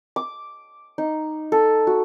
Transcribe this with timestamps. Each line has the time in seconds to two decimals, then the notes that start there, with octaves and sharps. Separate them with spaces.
0.16 D6
0.98 D#4
1.52 A4
1.87 F#4